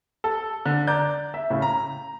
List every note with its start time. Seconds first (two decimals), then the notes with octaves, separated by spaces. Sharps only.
0.24 A4
0.66 D3
0.87 D5 A#5 G6
1.34 E5
1.50 A2 C#3
1.62 A#5